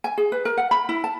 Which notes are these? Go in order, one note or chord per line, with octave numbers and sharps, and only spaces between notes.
G#5
G#4
B4
A#4
F#5
B5
E4
A5